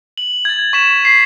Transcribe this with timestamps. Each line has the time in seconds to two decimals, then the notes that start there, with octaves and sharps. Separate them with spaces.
0.18 F#7
0.45 G#6 A6
0.73 C#6 B6 E7
1.05 B6 C7